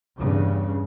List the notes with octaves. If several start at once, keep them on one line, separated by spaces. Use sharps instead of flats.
E2 G2 C#3